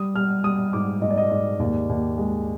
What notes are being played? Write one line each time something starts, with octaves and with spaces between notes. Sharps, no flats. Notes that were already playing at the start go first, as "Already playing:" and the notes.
Already playing: G3 D#6
G3 F6
G3 D#6
G#2 D6
G#2 D#5
D5
D#5
G#2 D5
D#2 D5
D#2
G#3